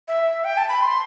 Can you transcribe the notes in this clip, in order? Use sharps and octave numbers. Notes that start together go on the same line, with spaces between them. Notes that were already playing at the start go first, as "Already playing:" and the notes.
E5
G5
A5
B5
C6